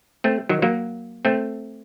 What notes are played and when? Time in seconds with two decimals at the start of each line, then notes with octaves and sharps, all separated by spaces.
0.24 A3 C4
0.49 D#3 F#3
0.62 F#3 A#3
1.25 A3 C4